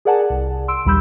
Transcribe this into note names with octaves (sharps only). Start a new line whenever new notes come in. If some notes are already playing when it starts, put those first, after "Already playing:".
G#4 A#4 D5 F#5 G#5 A5
C2
C6 E6 D7
A#1 D#2 G3 B5 E6 G6